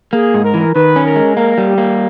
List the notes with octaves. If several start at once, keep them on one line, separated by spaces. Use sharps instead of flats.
A#3 G#4
G#2
A#4
E3
D#3 B4
C#4
A#4
G#3
A#3 A#4
G3
G4
A#3